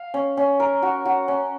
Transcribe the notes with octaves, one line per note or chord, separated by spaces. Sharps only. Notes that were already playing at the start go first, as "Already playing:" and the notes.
Already playing: F5
C#4
C#4
A#4
F#4
F#4
C#4